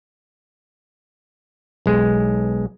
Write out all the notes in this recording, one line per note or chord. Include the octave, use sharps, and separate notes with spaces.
B1 G#3